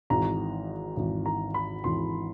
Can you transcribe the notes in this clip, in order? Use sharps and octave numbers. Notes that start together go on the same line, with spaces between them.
G#1 G#2 E3 A#5
G#1 G#2 E3
A#5
B5
G#1 G#2 E3 C6